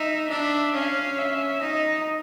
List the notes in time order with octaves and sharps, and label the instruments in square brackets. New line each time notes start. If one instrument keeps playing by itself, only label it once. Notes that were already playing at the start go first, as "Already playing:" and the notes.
Already playing: [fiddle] D#4 [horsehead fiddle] E5
[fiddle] D4 [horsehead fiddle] E5
[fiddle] C#4 [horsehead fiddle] F5
[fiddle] C#4 [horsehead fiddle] E5
[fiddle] D#4 [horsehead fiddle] D#5